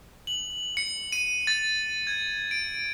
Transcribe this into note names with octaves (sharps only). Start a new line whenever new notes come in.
F#7
C#7
D#7
A6
G#6
D7